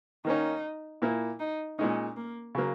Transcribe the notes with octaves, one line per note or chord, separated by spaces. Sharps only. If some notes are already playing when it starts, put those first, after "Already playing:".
D#3 A#3 C#4 D#4
A#2 A#3 E4
D#4
A#2 G#3 C#4 D#4
A#3
C#3 F#3 A#3